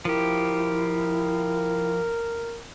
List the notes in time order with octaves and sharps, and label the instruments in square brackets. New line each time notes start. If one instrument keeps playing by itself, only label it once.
[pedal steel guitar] F3 G4 [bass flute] E4 [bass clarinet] A#4